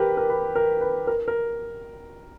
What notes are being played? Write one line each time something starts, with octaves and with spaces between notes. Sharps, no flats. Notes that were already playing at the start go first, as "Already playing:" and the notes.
Already playing: G4 A#4 B4
A#4
B4
A#4
B4
A#4
A#4